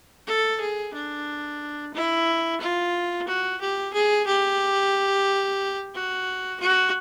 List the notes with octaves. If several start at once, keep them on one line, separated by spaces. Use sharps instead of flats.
A4
G#4
D4
E4
F4
F#4
G4
G#4
G4
F#4
F#4